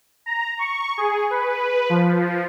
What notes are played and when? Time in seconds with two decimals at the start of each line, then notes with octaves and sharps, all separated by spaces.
0.26 A#5
0.59 C#6
0.98 G#4
1.30 B4
1.90 F3